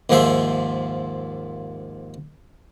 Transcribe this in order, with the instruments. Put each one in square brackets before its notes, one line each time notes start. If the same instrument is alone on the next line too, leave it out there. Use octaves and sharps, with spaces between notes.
[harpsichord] D#2 G#2 F3 G#4 C5 E5